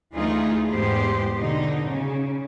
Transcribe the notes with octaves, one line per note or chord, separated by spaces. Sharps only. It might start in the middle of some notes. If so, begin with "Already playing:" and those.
D2 E3 A3 D#4 F4 G#4
E2 G#2 G#3 B3 G4 C5
B2 D3 D#4
C#3